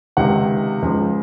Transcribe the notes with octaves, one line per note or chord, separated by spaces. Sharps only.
C#2 C3 D#3 F#5
C#2 C#3 F3